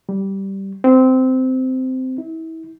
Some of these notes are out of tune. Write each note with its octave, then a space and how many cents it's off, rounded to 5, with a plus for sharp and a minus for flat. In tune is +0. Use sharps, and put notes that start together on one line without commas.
G3 -10
C4 -15
E4 -30